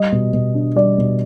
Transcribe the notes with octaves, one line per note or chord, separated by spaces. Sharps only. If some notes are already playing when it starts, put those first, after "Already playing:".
Already playing: G3 D#5
B2
B2
D4
G3 D5
B2